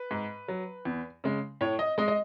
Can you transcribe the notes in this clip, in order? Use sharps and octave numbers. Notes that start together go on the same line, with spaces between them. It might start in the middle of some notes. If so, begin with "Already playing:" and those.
Already playing: B4
G#2
F#3
E2
C#3 G#3
A2 C#5
D#5
G#3 D#5
D#5